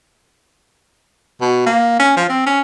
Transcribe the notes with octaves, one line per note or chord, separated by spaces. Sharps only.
B2
A#3
C#4
F3
C4
C#4